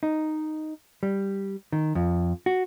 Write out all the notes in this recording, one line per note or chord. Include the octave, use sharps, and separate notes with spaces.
D#4
G3
D#3
F2
F#4